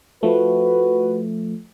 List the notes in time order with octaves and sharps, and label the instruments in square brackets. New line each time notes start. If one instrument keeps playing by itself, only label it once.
[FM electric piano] F3 A3 [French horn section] F#4 B4